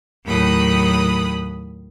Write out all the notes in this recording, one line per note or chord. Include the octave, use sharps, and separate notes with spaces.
D#2 A2 F#3 B5 D#6 F#6